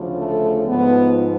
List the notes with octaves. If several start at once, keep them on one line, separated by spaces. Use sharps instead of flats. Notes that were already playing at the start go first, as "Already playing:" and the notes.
Already playing: D2 C#3 F3
A3
G#2 F3 B3